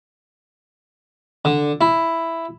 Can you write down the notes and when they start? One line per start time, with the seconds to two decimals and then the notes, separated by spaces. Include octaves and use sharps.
1.45 D3
1.81 E4